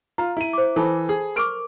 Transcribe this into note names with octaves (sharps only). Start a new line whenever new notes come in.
F4 A#5
E4 D#7
C5 D6
E3 A4 A5 B5
G#4
A#4 C#6 D6 F6 D7